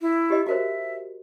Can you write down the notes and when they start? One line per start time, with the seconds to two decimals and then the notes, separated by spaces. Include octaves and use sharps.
0.01 E4
0.30 G4 D#5
0.47 F#4 A#4 C5 E5